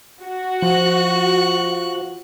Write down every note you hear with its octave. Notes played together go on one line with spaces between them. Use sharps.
F#4
F3 C#6 F#6